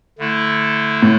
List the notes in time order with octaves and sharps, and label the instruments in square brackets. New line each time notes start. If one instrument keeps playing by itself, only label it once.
[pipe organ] D3 A3 E4
[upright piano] A2